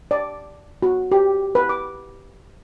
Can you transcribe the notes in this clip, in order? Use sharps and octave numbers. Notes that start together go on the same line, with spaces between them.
D5
F#4
G4
B4
D6